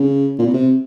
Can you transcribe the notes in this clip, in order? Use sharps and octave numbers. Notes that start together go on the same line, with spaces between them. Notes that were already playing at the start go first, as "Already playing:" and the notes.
Already playing: C#3
A#2
B2
C3